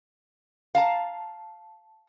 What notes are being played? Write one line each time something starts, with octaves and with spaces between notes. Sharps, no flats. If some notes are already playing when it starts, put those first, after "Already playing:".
F5 A5 A#5